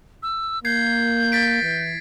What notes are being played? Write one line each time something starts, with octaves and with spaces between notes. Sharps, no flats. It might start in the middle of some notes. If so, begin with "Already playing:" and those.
E6
A#3 G6 G#6 C7
A6 B6 D7
E3